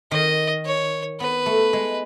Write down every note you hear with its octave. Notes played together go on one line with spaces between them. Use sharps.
D#3 D#5
C#5
B3 B4
A3
G#3